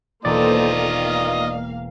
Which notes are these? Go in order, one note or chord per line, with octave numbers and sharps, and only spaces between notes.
E1 D#3 A#3 F4 A4 C5 D5 D#5
A#3 F5